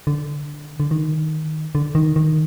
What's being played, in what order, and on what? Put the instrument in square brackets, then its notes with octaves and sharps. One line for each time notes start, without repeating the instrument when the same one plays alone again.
[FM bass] D3
D3
D#3
D3
D#3
D#3